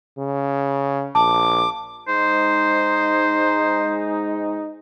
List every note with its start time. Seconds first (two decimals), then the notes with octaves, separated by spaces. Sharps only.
0.18 C#3
1.15 A#1 A5 D6
2.08 G#2 G#3 D#4 C5